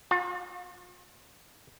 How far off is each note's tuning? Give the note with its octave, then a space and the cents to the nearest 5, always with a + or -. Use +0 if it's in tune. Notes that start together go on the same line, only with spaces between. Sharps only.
F4 +40